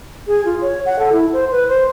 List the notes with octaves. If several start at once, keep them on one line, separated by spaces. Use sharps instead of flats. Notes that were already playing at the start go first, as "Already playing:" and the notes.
G#4
F4
C#5
F#5
A4
E4
C5
B4
C5